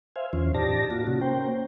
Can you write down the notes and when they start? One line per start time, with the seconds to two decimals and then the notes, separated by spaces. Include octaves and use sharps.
0.16 C5 E5 F5 G#5
0.33 E2 D#3 E3 C#4 F4 C5
0.54 A2 D#4 G4 D5 A5 A#6
0.90 A#3 F4 F#4
1.07 C3 C#4 F#4
1.21 A#3 C#4 C5 G5